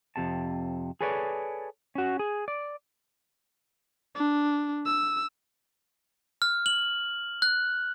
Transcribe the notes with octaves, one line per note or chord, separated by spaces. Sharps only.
F2 C3 A5
G#4 A4 B4 C#5 D5
C#4 F#4
G#4
D5
D4
E6
F6
F#7
F#6